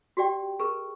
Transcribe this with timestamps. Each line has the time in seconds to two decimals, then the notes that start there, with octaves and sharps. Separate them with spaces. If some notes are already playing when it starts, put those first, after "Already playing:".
0.17 F#4 G4 D5 G5
0.59 G#4 A#4 B4 C#6